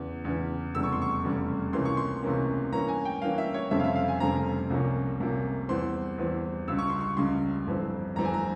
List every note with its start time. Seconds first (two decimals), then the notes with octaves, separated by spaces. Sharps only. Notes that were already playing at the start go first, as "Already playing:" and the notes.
Already playing: E2 C#3 E3
0.25 E2 C#3 E3
0.75 F1 E2 C#3 G3 E6
0.83 C#6
0.93 C6
1.02 C#6
1.24 F1 E2 C#3 G3
1.73 C#2 C3 E3 A#3 C#4 C6
1.85 C#6
1.97 C6
2.23 C#2 C3 E3 A#3 C#4
2.72 G2 E3 A#3 C#4 A#5
2.88 G#5
3.05 G5
3.22 G2 E3 A#3 C#4 F5
3.38 E5
3.54 C#5
3.71 F1 F2 C#3 G3 C4 E5
3.79 F5
3.84 E5
3.96 F5
4.08 G#5
4.20 F1 F2 C#3 G3 C4 A#5
4.70 C2 C3 F3 A#3 C#4
5.20 C2 C3 F3 A#3 C#4
5.69 E2 E3 G3 C4 C6
6.18 E2 E3 G3 C4
6.68 C#2 C#3 G3 E6
6.79 C#6
6.90 C6
7.01 C#6
7.17 C#2 C#3 G3 C6
7.66 G1 F2 E3 G3 C4
8.16 G1 F2 E3 G3 C4 A#5
8.25 G#5
8.34 A#5